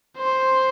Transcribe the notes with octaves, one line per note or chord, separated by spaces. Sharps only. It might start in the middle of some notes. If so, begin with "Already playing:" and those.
C5